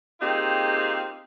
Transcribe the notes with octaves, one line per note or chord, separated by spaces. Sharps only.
A#3 C4 D#4 F4 G4 G#4